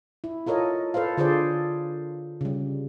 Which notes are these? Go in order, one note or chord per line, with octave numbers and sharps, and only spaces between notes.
E4
F4 A4 A#4 C#5 D#5
A4 B4 C5 F5
D3 F4 G#4 A4 C5 D5
C#3 G3